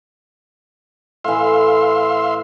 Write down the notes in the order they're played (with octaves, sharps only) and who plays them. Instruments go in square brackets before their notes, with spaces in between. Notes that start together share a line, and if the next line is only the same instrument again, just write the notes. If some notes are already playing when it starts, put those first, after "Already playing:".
[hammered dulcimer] A2 E3 [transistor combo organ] E5 F5 C6